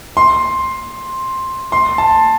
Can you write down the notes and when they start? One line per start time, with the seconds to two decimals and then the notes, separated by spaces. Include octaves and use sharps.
0.17 C6
1.72 C6
1.98 A5